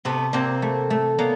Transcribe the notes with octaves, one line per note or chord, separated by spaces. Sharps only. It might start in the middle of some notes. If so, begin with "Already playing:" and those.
C3 A3 B3
C3 A#3 C4
A3
A3
A#3 B3 C#4